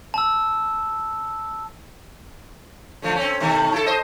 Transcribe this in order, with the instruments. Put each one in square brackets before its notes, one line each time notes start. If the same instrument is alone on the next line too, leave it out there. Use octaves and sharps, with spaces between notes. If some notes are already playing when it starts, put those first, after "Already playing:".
[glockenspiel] A5 E6
[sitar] D3 F3 A3
C4 C#4
B2 D#3 A3
E4 A4
C5 D#5